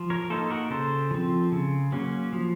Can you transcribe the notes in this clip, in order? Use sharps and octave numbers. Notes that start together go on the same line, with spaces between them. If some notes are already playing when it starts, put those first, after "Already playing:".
Already playing: F3
A#4 C#5
A#3 D#4 A4 C5
F#4 A#4
C#3 A4 C5
F3 C4
C#3
F#3 A#3 C#4
F3